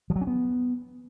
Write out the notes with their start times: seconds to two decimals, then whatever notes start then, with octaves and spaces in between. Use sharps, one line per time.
0.10 F3
0.16 F#3
0.21 C#4
0.27 B3